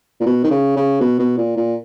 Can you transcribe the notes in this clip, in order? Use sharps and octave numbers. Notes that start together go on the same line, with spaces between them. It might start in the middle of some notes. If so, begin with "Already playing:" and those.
A#2
B2
D#3
C#3
C#3
B2
B2
A#2
A#2